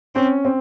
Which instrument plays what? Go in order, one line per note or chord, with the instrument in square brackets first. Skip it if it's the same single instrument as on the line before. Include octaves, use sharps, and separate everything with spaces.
[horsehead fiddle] C4 [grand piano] C#4
[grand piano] C4